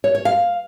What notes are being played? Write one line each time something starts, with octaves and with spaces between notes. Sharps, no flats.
C#5
C#5
F5